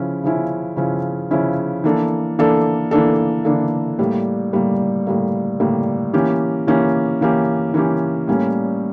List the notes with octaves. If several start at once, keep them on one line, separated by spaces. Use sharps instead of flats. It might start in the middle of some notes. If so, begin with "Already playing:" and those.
Already playing: C#3 F3 C#4 E4
C#3 F3 C#4 E4
C#3 F3 C#4 E4
C#3 F3 C#4 E4
E3 A#3 D4 A4
E3 A#3 D4 A4
E3 A#3 D4 A4
E3 A#3 D4 A4
A2 G3 A#3
A2 G3 A#3
A2 G3 A#3
A2 G3 A#3
E3 A#3 C#4 G4
E3 A#3 C#4 G4
E3 A#3 C#4 G4
E3 A#3 C#4 G4
A2 G3 A#3 C#4